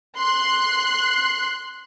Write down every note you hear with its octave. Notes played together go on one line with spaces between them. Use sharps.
C6 F#6 C7